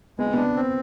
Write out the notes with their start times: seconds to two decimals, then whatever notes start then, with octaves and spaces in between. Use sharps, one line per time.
0.19 G#3 B3
0.26 C4
0.34 B3 D4
0.56 C4